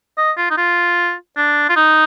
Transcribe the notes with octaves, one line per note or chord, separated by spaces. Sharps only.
D#5
F4
D#4
F4
D4
F4
D#4